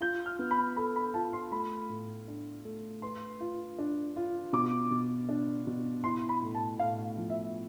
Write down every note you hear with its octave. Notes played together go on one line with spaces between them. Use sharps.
F4 G6
F6
B3
B5
A4 B5
B5
F4 A5
C6
A3 B5
A2
D4
A3
B4 C6
F4
D4
F4
B2 D6
B2
D4
B2
E4 C6
B5
A2
A5
A2 F5
F3
E5